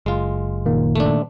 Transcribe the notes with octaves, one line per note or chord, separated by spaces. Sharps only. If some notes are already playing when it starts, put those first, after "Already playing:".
F#1 G#3 F4
A#2 D#3 A#3
A3 D4